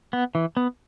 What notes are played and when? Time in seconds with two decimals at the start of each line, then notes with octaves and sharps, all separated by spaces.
0.13 B3
0.35 E3
0.57 B3